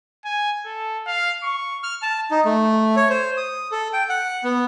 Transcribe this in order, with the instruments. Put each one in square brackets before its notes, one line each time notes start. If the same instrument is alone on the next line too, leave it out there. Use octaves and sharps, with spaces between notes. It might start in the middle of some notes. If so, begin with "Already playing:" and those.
[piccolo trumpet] G#5
A4
F5
C#6
[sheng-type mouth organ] F6
A5
D#4
A3
C#5
C5
D#6
A4
G5
F#5
B3